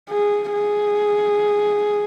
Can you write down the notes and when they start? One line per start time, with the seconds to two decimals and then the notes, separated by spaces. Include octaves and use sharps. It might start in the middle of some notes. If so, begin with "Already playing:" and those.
0.10 G#4
0.53 G#4